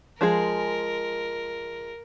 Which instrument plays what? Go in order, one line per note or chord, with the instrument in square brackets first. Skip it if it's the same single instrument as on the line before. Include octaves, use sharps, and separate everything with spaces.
[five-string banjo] F3 G#3 G#4 [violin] A#4